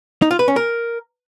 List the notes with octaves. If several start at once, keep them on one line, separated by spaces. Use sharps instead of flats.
D#4
F4
B4
C#4
A#4